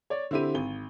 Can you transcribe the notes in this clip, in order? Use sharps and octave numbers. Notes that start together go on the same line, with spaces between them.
C#5 D5
D3 C4 E4 G4 D#7
G#1 G7